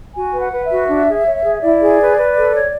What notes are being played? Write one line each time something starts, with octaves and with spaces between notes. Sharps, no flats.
F#4 G#5
B4
F#5
B4
E5
F#4
D4
G#4
C#5
G#4
E4 D5
G#4
B4
B4
A4
C#5